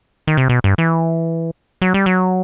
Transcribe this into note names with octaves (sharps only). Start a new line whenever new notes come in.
D#3
C3
B2
G2
E3
F#3
G3
F#3